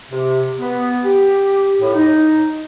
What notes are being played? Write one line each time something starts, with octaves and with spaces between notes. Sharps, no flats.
C3
B3
G4
A2
D#4